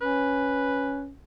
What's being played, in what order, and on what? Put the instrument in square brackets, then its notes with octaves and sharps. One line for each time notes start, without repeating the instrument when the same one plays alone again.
[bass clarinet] C#4 [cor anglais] B4